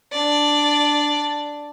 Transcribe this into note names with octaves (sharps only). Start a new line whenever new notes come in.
D4 D5